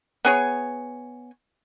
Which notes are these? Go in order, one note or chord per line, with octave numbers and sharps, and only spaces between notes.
B3 G#4 C#5